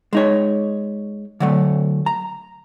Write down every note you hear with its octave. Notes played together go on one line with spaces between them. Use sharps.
G#3 D#4 C#5
D3 F#3 A3
A#5